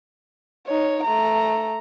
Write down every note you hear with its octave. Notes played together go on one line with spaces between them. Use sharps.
D#4 C#5
A3 A#5